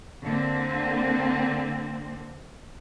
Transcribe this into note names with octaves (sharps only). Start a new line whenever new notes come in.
D3 A#3 C4